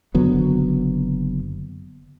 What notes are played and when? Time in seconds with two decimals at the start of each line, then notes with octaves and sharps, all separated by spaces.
0.15 F#1 D3 F#3 B3